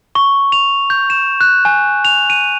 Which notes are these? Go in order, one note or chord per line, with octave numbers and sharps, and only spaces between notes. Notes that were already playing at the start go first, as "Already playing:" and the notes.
C#6
F7
G6
E7
F#6
G#5
F7
D#7